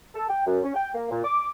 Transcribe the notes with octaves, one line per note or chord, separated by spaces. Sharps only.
A4
G5
F#2
C#4
G5
A#3
A#2
D6